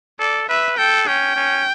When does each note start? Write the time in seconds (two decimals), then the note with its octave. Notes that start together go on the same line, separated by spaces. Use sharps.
0.20 A4 D5
0.48 B4 E5
0.78 A4 G5
1.07 C#4 G5
1.36 C#4